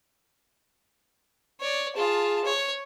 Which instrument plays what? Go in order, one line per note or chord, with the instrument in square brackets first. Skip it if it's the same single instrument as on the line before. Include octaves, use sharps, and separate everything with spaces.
[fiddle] C#5 D5
[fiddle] F4 A5 [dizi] G#4
[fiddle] C#5